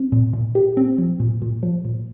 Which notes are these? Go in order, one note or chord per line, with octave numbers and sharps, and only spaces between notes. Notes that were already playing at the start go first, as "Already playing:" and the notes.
Already playing: C4
A#2
A#2
G4
C4
F3
A#2
A#2
F3
A#2